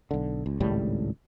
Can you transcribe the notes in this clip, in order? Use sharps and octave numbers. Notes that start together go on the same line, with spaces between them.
B1 D3
C#2
G#1 C#2 A2 G3